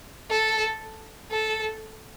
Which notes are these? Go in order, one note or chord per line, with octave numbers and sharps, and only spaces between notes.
A4
A4